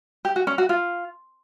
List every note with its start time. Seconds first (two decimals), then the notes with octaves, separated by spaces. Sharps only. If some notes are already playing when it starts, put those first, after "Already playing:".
0.25 G4
0.36 F#4
0.47 C#4
0.58 F#4
0.69 F4